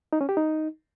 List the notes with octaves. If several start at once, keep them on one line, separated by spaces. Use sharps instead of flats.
D#4
C#4
G4
D#4